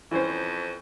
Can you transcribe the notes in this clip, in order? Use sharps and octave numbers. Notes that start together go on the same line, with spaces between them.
F2 E3 C#4 C5